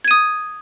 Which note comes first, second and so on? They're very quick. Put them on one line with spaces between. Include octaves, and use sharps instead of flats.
G#6 D#7 D#6